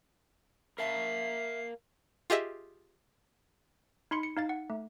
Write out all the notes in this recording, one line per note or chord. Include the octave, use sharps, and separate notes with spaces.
A#4 E5 F5 A5 C7
F4 G4 G#4 D#5 E5
D#4 B5 C6 C#7
C#7
D#4 F5 A6
F#5
A3